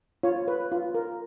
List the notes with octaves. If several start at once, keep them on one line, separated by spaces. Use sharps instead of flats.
F4 C#5
B4
F4
A#4